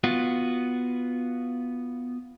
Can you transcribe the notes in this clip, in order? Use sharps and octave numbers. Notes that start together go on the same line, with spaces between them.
B3 F4 F#4